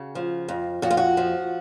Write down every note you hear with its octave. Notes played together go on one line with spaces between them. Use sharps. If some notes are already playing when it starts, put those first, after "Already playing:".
Already playing: C#3 F#4
F3
F2
F2 F#4
F4
F#4
F3